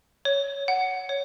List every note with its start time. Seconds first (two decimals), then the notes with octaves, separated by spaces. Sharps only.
0.25 C#5
0.68 F#5
1.09 C#5